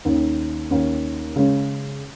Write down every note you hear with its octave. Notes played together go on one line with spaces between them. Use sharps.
D#2 D#3 C#4
D#2 D#3 C#4
C#3 G#3 C#4